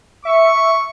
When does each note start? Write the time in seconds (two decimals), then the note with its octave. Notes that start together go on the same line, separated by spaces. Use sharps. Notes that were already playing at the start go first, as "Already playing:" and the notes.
0.25 E5 C#6